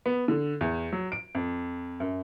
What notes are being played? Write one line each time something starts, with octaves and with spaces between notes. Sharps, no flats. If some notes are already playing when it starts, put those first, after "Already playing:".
B3
D3
E2
F#3
D7
F2
F#2